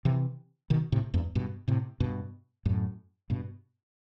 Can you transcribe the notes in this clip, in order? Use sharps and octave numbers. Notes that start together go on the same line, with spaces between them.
C3 E3
B2 D#3
A2 C3
E2 G2
G2 B2
A2 C3
G2 B2
F#2 A2
G2 B2